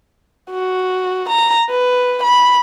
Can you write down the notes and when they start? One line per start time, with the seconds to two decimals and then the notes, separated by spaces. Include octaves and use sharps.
0.51 F#4
1.29 A#5
1.70 B4
2.23 B5